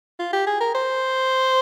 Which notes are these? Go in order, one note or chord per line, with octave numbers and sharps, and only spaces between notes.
F4
G4
G#4
A#4
C5